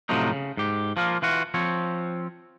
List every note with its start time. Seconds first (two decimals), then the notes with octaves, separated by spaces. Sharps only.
0.09 A2 C3 F3 F#3 D#4
0.32 C#3
0.57 G#2 G4
0.97 F3 A#3 F4
1.22 E3 F4 F#4
1.54 F3 C4 C#5